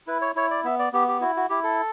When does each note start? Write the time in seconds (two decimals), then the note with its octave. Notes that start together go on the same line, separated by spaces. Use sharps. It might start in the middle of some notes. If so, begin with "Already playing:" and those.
0.07 E4 B4
0.22 C#5
0.36 E4 C#5
0.51 D5
0.64 B3 E5
0.79 D5
0.93 B3 G4
1.08 G4
1.21 E4 F#4
1.37 F#4
1.50 E4 G4
1.64 A4